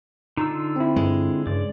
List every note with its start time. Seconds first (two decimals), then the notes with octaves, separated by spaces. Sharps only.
0.37 D3 D#4 F4 E6
0.76 C4 E4
0.96 G2 G#3
1.47 G2 C#3 D5